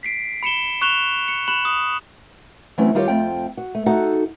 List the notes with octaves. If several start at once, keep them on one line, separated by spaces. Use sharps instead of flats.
B6 C7 D7
B5 C#7 E7 G7
C#6 F#6 E7 F7 G7
C#7
B5 F#6 E7 F#7
D#6
E3 F#3 A3 C4 C#4 E4
D#3 G3 F4 G4 C5 C#5
F2 A3 C4 F4 G5
F#4
A3
D#4 F#4 A4 F#5